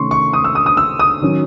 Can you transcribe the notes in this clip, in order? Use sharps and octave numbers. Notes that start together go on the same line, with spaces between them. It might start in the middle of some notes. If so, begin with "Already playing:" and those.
Already playing: C3 D#3 A3 C#4 C6 C#6
C#6
D#6
E6
D#6
D#6
E6
D#6
D#3 F#3 C#4